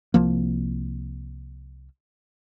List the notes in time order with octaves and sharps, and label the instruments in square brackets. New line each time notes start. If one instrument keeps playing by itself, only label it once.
[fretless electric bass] C2 F3 A#3